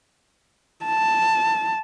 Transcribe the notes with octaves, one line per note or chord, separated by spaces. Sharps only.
A5